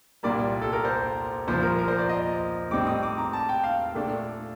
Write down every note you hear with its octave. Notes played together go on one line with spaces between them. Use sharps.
C2 A#2 G3 A#3 D5
A4
A#4
C5
C2 A#2 F3 C5
A#4
A#4
C5
D5
D#5
A2 G3 C4 D#4 D6
D#6
D6
A#5
A5
G5
F5
A#2 A3 D4